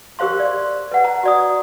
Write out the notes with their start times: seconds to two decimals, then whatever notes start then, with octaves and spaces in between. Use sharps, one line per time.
0.19 G4 A#4 C5 F5 C6
0.39 D5
0.91 B4 F#5
1.04 A#5
1.23 F#4 D5 D#6